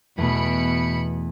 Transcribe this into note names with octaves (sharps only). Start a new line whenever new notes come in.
E2 B2 A3 B5 C#7